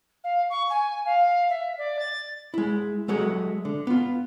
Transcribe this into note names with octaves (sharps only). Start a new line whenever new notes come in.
F5
C#6
G#5
F5
E5
D5
A6
G#3 E4
F#3 G#3 A3 F#4 G#4
D3
B3 F4